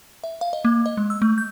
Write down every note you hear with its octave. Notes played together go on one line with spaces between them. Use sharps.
E5
F5
D#5
A#3
D#5
G#3
E6
A3
G6